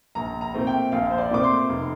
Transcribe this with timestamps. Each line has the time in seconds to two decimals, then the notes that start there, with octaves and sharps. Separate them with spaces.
0.15 A#1 A#5
0.41 A#5
0.54 A#2 A3 C4
0.67 G5
0.92 A#1 F5
1.11 C5
1.18 D5
1.31 A#2 A3 C4 D6
1.44 C6
1.69 F1